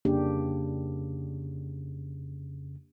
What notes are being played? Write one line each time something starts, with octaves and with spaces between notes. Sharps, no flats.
F2 C#3 A#3 D4 G4